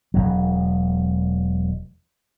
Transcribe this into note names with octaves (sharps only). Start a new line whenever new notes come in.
E1 D#2 F#3